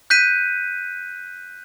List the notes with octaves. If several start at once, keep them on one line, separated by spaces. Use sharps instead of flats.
F#6 G6 B6 D#7